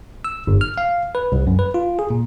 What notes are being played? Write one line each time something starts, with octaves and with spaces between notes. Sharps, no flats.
E6
G1
F6
F5
B4
C2
F#2
B4
F4
G#4
A#2